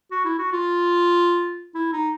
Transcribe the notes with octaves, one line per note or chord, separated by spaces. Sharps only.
F#4
E4
F#4
F4
E4
D#4